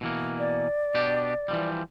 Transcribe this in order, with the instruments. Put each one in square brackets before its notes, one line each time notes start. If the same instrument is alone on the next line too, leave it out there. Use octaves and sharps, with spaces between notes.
[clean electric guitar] B2 E3 A#3
[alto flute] D5
[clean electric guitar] B2 D4 G4
E3 F3 G3